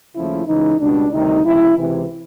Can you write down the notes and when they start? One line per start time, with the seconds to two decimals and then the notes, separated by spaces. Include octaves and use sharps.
0.15 D#2 C#3 F3 A3 C#4 E4
0.46 C#2 C#3 E3 D#4
0.80 C#2 B2 G3 D4
1.12 D2 C3 D#3 G3 C4 D#4
1.45 C#2 C3 F3 E4
1.78 C#2 C3 E3